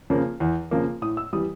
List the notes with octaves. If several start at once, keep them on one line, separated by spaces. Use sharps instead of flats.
C#3 F3 A#3
E2
C#3 F3 A#3
A2 D#6
E6
E3 G3 D#6